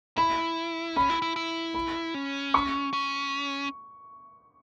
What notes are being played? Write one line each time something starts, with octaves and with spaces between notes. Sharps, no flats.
E4 B5
C#4 B5
E4
E4
E4
B5
C#4
C#6
C#4